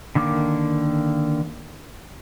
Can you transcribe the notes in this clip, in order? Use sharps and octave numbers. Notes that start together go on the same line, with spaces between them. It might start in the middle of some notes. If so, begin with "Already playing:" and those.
D3 D#3 A#3 D6